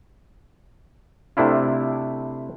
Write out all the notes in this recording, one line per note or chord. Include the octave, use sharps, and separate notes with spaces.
C3 A3 D4 E4 F4